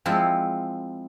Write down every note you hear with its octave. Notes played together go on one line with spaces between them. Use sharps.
F3 G#3 C4 E4 F4